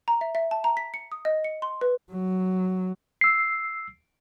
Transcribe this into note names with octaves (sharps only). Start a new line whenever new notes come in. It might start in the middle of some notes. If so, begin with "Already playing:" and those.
A#5
E5
E5
A5
A#5
B6
C#7
D#6
D#5
C#7
C6
B4
F#3
E6 C7